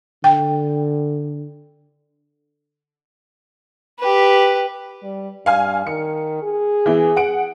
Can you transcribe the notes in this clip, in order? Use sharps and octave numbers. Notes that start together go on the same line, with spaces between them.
D3 G5
G4 B4
G3
G2 F5 G#5 F6
D#3 C#7
G#4
E3 B3 E4
F#5 D7